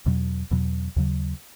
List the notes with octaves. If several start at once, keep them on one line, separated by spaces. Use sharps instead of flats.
E2 B2 F#3
E2 B2 F#3
D#2 C#3 F#3